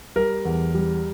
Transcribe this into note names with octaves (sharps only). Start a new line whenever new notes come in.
G3 A#4
E2
G3